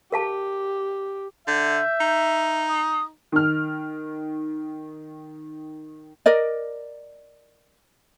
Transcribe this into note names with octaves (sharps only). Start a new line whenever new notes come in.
G4 A#4 F5 A5
D3 E5 G6
D#4
D#6
D#3 F6
A#4 D5 D#5